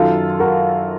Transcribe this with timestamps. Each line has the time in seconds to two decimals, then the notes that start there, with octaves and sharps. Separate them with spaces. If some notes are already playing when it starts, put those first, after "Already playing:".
Already playing: F#2 D#3 F4 A4
0.40 F#4 A#4